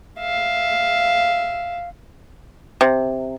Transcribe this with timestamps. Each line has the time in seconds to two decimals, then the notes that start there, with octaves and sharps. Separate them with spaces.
0.20 E5 F5
2.81 C3